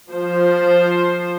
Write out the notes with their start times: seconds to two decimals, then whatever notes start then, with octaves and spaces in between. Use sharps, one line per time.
0.11 F3 C5